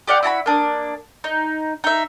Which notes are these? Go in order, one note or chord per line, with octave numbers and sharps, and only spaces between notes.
G4 D5 F5 F#5
E4 F#4 A5 B5
A#3 D4 D#6
D#4
D#4 E5